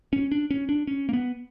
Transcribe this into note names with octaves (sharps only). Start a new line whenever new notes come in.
C#4
D4
C#4
D4
C#4
A#3
B3